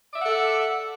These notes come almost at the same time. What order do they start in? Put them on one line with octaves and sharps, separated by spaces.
D5 E5 F#5 A4